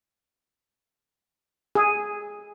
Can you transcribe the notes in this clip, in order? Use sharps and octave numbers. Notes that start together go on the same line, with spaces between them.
G#4